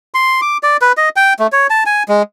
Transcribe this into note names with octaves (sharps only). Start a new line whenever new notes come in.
C6
D6
D5
B4
D#5
G5
A3
C#5
A5
G#5
G#3